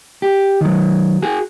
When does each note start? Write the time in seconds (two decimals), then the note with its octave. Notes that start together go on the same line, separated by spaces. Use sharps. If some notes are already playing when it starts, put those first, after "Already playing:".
0.22 G4
0.61 D#3 F#3
1.22 F#4 G#4